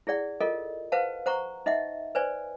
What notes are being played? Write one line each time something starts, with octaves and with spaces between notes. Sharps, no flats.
E4 G#4 D5 F#5
F4 A4 A#4 D#5
B4 C5 F5 F#5 A5
C5 F#5 A#5 C#6
D#4 D#5 E5 F#5
B4 C5 D5 G#5